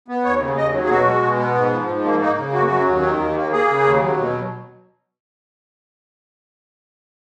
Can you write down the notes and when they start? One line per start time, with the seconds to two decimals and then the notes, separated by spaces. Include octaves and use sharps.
0.08 B3
0.25 D#2 C#5
0.40 C#3
0.57 D#2 D#5
0.73 F#3
0.85 G#4
0.90 B2 F#4
1.06 G#3
1.23 B2
1.39 B3
1.55 G#2
1.72 F3
1.89 G#2
2.05 A#3
2.20 A#3 D#4
2.38 C#3
2.53 F#2 F#4
2.71 F#3
2.87 D#2
3.03 D#3
3.19 D#2
3.36 A#3
3.52 A#3 G#4
3.69 C#3
3.84 D#2
4.01 F#3
4.18 B2